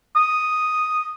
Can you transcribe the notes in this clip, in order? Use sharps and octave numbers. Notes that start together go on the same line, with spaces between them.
D#6